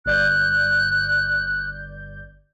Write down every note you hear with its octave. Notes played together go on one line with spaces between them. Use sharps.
G1 D5 F#6 G6